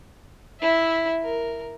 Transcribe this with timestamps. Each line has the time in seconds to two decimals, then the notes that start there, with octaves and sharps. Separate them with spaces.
0.60 E4 E5
1.22 A#4